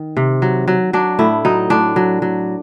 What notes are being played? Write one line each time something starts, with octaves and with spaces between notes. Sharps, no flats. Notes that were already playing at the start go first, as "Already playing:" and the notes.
Already playing: D#3
C3
F#3
F#3
F#3 D4
A2 E4
F#3 D#4
A2 D4
F#3
F#3